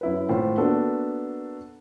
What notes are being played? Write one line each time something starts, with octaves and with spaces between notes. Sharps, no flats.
F#2 E4 B4
G#1 A2 F4 C5
A#3 B3 D4 F#4 A4